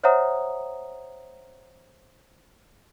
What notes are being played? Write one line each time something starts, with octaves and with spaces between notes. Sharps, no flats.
C5 C#5 E5 F#5 A#5 D#6